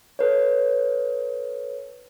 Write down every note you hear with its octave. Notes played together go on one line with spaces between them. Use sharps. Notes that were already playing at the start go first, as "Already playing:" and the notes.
A4 B4 C#5